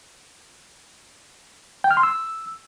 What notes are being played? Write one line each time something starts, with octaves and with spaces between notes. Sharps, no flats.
G5
F6
C6
E6